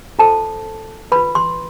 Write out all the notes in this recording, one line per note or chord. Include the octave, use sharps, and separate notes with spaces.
F4 A4 C5 A5
F4 B4 B5
C6